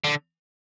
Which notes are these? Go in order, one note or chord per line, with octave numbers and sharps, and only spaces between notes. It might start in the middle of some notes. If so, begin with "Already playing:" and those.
D3